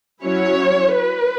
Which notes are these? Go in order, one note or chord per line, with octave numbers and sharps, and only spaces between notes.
F#3 C#4 E4 C#5
B4